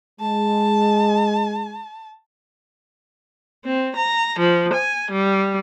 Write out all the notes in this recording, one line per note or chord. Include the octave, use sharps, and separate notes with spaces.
G#3 A5
C4
A#5
F3
G#5
G3